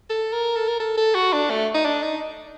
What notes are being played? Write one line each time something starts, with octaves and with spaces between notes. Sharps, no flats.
A4
A#4
A4
A#4
A4
A4
F#4
D4
A3
D#4
D4
D#4